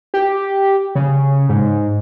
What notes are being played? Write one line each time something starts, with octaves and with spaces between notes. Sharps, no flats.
G4
C#3
G#2